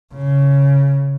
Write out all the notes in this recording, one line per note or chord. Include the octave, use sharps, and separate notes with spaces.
C#3